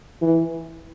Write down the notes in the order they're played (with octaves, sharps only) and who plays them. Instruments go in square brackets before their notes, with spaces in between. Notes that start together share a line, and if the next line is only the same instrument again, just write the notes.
[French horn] E3